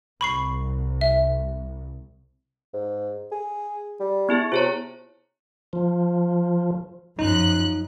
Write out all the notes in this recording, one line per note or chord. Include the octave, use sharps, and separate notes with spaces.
C2 B5 C#6 C7
E5
G#2
G#4
G3
B3 E4 G#4
C3 F4 G#4 C#5
F3
F#2 F3 D#4 F#6